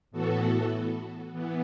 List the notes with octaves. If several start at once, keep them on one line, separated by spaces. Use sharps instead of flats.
A2 E3 B3 F#4 A4
E3 B3